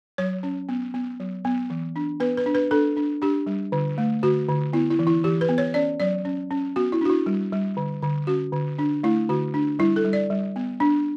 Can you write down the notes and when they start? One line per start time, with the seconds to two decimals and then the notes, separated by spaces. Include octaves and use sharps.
0.18 F#3 C#5
0.43 C#4
0.69 B3
0.94 B3
1.20 F#3
1.45 B3
1.70 E3
1.96 D4
2.20 B3 B4
2.37 B4
2.46 D4
2.55 B4
2.71 D4 A4
2.97 D4
3.22 D4 G4
3.46 G3
3.72 D3
3.98 A3
4.23 D3 F#4
4.49 D3
4.73 B3 E4
4.90 E4
4.99 E3
5.07 E4
5.24 E3 G4
5.41 B4
5.49 B3
5.58 C#5
5.74 C#4 D5
6.00 F#3 D5
6.25 C#4
6.51 C#4
6.76 B3 F#4
6.92 E4
7.01 D4 F#4
7.10 E4
7.26 G3
7.52 G3
7.77 D3
8.02 D3
8.27 C#4 F#4
8.52 D3
8.79 D4
9.04 A3 E4
9.29 D3 F#4
9.54 D4
9.79 G3 E4
9.96 A4
10.05 G3
10.13 D5
10.30 G3
10.56 B3
10.80 D4